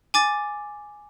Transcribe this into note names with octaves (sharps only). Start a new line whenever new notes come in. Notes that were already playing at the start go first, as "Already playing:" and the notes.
G#5 D6 A6